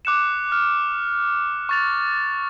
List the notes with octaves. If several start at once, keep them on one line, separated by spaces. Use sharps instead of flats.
D6 F#6 C#7 E7
F6
C#6 A6 F7